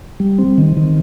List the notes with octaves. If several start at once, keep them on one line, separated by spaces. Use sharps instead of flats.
G3
C4
D#3
D#3